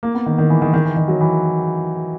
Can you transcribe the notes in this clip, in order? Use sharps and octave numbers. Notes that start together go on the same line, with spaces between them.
A#3
B3
D#3
D#3
E3
D#3
D#3
E3
D#3
F#3
E3